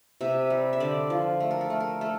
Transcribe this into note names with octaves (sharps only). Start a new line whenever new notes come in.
C3 E5
G3
E5
D3 D5
F3
A3
A#4
A4
A3
A#4
A3 A4